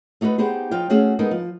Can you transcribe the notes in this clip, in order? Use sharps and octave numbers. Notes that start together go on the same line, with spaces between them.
A3 D#4 F#4 A#4 B4
B3 D#4 G4 G#4 C5
F3 D#4 F5 G5
A3 C#4 F#4 G#4 F5
G#3 B3 D#4 A4 A#4
F3